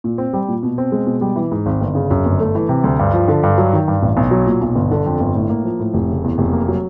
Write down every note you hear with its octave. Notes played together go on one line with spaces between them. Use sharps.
A#2
C4
G3
A#2
B2
C4
G#3
B2
G3
E3
G#2
G#1
G1
C#3
F#2
G1
A3
E3
C3
D2
G2
F3
D3
G2
F#3
D#3
G2
A1
B1
F#3
A#2
B1
G1
D3
F2
G1
A2
A#3
F3
A2
F1
C#3
E2
F1
A#3
F#3